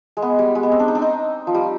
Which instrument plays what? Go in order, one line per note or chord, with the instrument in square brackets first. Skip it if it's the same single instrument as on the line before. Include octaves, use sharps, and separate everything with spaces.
[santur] G#3
B3
G3
G#3
B3
C4
D4
D#4
D4
D#4
F3
G3